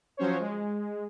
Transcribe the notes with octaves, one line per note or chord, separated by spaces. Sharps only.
F3 F#3 C#4 C5 C#5
G#3